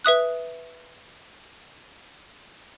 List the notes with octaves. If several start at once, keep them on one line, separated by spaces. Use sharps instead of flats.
B4 E5 D#6 F#6